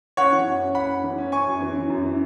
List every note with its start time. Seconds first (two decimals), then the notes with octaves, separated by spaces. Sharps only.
0.17 C#4 C#5 F#5
0.32 E3
0.47 F#2
0.61 C#4
0.75 C#4 F#5 B5
0.89 C#4
1.04 E3
1.18 C#4
1.32 C#4 G#5 C#6
1.47 F#2
1.61 E3
1.76 E3
1.90 F#2
2.04 E3